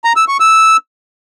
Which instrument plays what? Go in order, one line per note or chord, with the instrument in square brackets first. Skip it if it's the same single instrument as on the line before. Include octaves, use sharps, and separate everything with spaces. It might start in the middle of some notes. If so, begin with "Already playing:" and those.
[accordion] A#5
E6
C#6
E6